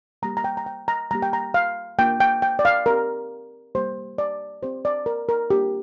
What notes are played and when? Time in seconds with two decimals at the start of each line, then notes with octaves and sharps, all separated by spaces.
0.22 G3 A#3 G4 A#5
0.37 A#5
0.44 G5
0.57 A#5
0.66 G5
0.88 A#5
1.11 G3 A#3 G4 A#5
1.22 G5
1.33 A#5
1.54 F5
1.98 A#3 D4 F4 G5
2.20 G5
2.42 G5
2.59 D5
2.65 F5
2.86 C4 G4 A#4
3.75 G3 A#3 G4 C5
4.18 D5
4.62 C4 G4 C5
4.85 D5
5.06 A#4
5.29 A#4
5.50 A#3 D4 F4 G4